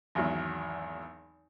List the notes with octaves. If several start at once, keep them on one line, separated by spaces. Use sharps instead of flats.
G#1 E2 F#3 E4